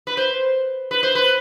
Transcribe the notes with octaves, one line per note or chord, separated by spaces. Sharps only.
B4
C5
B4
C5
B4